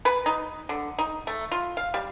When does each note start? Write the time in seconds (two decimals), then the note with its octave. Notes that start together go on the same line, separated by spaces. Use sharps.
0.05 B4
0.26 D#4
0.69 D3
0.98 D#4
1.27 A3
1.52 F4
1.77 F5
1.94 G3